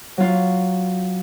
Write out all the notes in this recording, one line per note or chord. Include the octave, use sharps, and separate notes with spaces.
F#3 F4